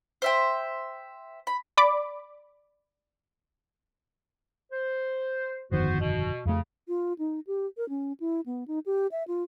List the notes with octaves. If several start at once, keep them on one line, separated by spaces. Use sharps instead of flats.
C5 E5 G5
B5
D5 B5 D6
C5
G1 F2 D#3 B3 F#4 C5
B2
F2 C#3 A3
F4
D#4
G4
A#4
C#4
E4
B3
D#4
G4
E5
F4